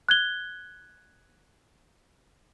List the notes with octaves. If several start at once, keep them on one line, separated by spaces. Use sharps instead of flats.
F#6 G#6 G7